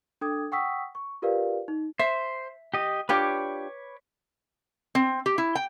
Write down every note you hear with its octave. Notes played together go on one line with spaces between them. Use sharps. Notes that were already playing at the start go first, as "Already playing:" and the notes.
D4 A4 G5 D6 D#6 G#6
F#5 G5 C#6 D#6 E6 B6
C#6
F4 G4 A#4 B4 D5 F5
D#4
C5 E5
G4 D#5
D4 F4 G4 B4 C#5 D6
C4
G4
E4
G5